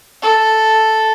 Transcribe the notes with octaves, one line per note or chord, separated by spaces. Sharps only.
A4